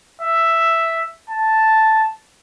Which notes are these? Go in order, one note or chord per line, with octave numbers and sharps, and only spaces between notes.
E5
A5